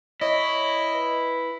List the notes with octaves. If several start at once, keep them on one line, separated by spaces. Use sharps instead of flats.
E4 C#5 D#5
B4